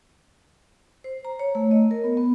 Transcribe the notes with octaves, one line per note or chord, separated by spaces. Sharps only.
C5
A#5
C#5
A3
D#5
A#4
B3
B3